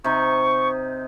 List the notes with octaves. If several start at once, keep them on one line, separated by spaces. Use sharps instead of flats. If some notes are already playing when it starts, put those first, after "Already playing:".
C3 D#4 C#6